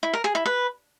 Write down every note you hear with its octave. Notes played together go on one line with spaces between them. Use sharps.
E4
A#4
G#4
E4
B4